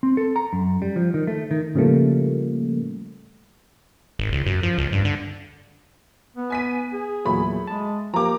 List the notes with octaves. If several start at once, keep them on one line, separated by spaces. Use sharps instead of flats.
C4
A4
A#5
F#2
G3
F3
D#3
A3
D#3
A2 C#3 F3 G3 A3 A#3
G#1
C#2
F#2
F3
C#2
G2
D3
B3
G#5 B6 D#7
G#4
E2 A#2 F#3 A3 B5
G#3 A5
F3 A#3 G4 A#5 D6